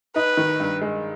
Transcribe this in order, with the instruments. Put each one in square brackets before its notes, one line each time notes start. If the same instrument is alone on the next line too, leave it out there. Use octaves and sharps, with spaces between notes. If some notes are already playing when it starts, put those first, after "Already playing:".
[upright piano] D#4 [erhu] B4
[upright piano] D#3
G2
G#3